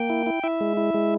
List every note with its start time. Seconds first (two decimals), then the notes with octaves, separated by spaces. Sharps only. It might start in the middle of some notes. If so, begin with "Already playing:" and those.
Already playing: A#3 G5
0.10 E4
0.26 E4
0.43 E4 E5
0.61 G#3
0.77 E4
0.94 G#3